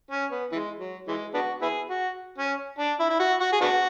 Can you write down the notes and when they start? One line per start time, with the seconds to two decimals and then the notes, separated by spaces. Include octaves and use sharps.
0.11 C#4
0.31 B3
0.52 E3 G#3
0.79 F#3
1.07 E3 G#3
1.34 B3 D4 F#4
1.62 B3 E4 G#4
1.90 F#4
2.38 C#4
2.79 D4
2.99 E4
3.10 E4
3.19 F#4
3.40 F#4
3.53 G#4
3.61 B3 D4 F#4